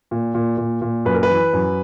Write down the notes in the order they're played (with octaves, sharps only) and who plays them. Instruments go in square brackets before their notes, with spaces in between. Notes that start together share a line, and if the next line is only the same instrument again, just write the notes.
[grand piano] A#2
A#2
A#2
A#2
F#2 B4
A#4
B4
E3
F#2